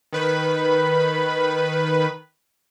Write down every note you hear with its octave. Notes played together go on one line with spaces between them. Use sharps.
D#3 B4 B5